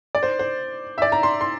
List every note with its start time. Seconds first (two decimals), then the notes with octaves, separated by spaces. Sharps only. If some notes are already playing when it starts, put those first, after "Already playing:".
0.15 D5
0.23 C5
0.39 C5
0.98 E5
1.02 D5
1.12 A#5
1.23 C6
1.41 C6